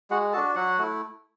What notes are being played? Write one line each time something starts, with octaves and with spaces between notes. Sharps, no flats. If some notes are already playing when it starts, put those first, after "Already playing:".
G#3 F#4 F#5
D4 F#4 A4 A5
F#3 F#4 F#5
A3 E4